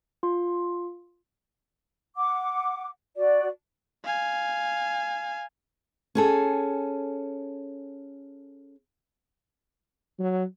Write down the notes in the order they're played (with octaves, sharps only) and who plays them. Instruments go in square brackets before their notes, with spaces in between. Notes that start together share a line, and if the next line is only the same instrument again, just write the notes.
[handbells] F4 C6
[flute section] F#5 D6
F#4 D5
[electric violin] F5 G#5
[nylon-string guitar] C#4 G#4 A4
[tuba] F#3